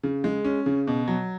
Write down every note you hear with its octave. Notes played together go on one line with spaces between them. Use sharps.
C#3
G#3
C#4
C#3
B2
F#3